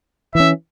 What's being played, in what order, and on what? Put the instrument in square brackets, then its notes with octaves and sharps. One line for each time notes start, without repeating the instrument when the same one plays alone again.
[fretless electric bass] E3 C#4 [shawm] E5